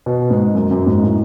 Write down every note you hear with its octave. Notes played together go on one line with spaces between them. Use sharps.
B2
G#2
F#2
F#2
G#2
A2